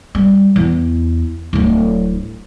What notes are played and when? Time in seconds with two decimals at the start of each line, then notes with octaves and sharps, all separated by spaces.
0.15 G3
0.56 E2
1.53 D1 F#3